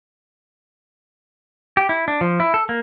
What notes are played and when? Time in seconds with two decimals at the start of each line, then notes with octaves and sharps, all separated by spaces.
1.77 G4
1.89 E4
2.08 D4
2.21 F3
2.40 E4
2.54 A4
2.69 A#3